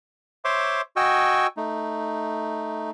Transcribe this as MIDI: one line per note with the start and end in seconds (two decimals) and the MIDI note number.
0.45 0.81 72
0.45 0.81 73
0.45 0.81 76
0.45 0.81 84
0.45 0.81 86
0.96 1.47 66
0.96 1.47 75
0.96 1.47 79
0.96 1.47 80
0.96 1.47 85
0.96 1.47 88
1.57 2.91 57
1.57 2.91 63